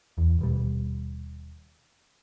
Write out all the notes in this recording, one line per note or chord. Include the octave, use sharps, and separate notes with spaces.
E2
D#1 B2 G3